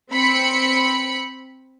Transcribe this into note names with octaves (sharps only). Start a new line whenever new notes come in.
C4 B5 C#7